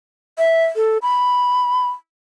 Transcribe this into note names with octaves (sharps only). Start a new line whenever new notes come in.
E5
A4
B5